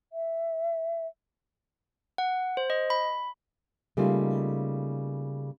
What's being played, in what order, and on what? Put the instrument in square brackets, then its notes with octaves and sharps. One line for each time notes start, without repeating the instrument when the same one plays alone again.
[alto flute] E5
[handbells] F#5
C5
D#5
B5
[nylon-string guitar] C#3 G3 A3 A#3 D#4 F4